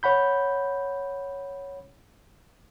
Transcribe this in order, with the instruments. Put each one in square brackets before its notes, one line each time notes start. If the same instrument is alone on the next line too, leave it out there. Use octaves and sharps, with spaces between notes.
[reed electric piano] C#5 F#5 B5 G6